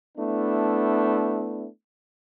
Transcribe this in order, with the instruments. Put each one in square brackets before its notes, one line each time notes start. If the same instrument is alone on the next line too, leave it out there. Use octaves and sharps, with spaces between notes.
[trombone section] A3 B3 D4 E4